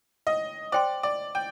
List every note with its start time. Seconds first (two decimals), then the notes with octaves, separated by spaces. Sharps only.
0.27 D#5
0.72 C5 D5 G5 C6
1.03 D5
1.35 G5